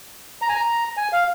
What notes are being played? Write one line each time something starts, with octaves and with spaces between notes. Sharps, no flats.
A#5
G#5
A#5
G#5
F5